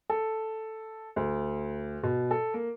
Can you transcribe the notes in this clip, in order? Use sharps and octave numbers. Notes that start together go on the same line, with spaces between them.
A4
D2
B2
A4
A#3